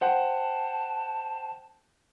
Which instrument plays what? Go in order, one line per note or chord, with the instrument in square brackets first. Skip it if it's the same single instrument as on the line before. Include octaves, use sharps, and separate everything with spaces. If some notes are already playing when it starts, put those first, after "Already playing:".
[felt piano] C5 F#5 G5 [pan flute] A5